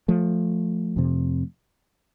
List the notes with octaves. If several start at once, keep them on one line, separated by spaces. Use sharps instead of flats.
F3 A3
F2 C3